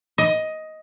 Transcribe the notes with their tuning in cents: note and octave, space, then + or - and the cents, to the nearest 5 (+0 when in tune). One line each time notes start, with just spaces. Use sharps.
D#5 +10